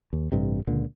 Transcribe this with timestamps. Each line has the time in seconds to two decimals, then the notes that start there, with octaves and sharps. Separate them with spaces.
0.13 D#2
0.32 A1 G2 C3
0.67 C#2 A#2 D3